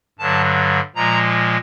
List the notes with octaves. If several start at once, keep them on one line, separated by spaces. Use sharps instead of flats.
G2 D3 F#3 A5
A#2 F3 G#3 A#5